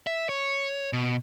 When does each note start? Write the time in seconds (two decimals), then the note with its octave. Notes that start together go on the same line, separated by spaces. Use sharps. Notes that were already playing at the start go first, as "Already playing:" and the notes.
0.07 E5
0.29 C#5
0.93 B2